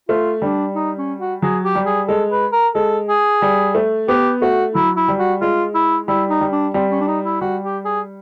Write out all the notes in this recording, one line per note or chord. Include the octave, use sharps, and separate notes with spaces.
A3 F4
G3 D4
D#4
C#4
F#4
F#3 G#4
G4
G3
G#4
G#3 A4
B4
A#4
G#3 A4
G#4
G3
A3
B3 G4
A3 F#4
F#3 E4
E4
G3
F#4
G#3 F4
E4
G3 E4
D#4
G3
D4
G3 C4
C#4
D4
D#4
E4
G3 F#4
G4
G#4